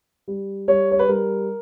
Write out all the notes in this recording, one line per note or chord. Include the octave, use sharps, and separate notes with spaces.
G3
G3 C#5
C#5
B4
G3 A#4